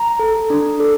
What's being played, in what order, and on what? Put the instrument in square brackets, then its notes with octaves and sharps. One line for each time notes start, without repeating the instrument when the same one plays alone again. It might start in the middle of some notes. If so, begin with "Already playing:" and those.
Already playing: [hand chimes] A#5
A4
D4
A4